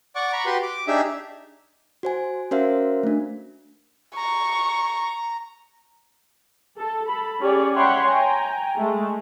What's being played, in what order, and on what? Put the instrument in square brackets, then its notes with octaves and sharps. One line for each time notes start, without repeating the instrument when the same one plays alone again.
[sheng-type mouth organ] D5 F#5 C#6 D6
A#5 B5 C#6
F#4 G4 B4 C6
D6
D4 D#4 G4 G#4 E5
[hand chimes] F#4 C5 G#5
C#4 F#4 A#4 C5 E5 F5
A3 D4
[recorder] A#5 [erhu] C#6
[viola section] A4
A4 B5
C#4 G4 G#4 C#5 D5
C#5 E5 F#5 G5 B5 C6
G5 G#5 A#5
G#3 A3